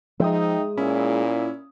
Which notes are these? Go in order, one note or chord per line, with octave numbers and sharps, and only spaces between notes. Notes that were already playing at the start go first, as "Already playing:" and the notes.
F3 G#3 D#4 E5 G5 D#6
A#2 C#4 E4